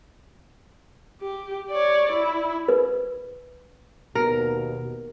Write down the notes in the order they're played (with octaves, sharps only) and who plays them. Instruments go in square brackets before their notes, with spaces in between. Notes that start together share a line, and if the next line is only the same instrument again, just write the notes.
[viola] G4
C#5 D5
E4
[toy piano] B4
[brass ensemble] D#2 B2 [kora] A#4